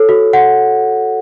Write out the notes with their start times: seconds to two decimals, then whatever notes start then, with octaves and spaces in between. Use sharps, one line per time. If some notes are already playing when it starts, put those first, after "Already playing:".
Already playing: A4 C#5
0.09 F#4
0.33 F#5